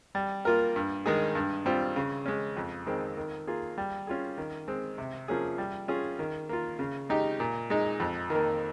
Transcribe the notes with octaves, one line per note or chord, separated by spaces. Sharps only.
G3
A#3 F4 A#4
G2
D#3 G#3 D#4 G#4
G2
G3 C4 F4
C#3
G#3 C#4
F2
D#3 G#3 C4
D#3
A#3 F4 G#4
G3
C#4 F4 G#4
D#3
G#3 C4
C3
F3 A#3 C#4 G#4
G3
C#4 F4 G#4
D#3
A#3 F4
C#3
G#3 D#4 G4
A#2
G#3 D#4
F2
D#3
A#3